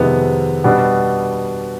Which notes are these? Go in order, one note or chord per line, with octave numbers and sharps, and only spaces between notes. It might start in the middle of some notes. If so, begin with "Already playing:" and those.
Already playing: F2 C3 D#3 G#3 B3
B2 G3 B3 D4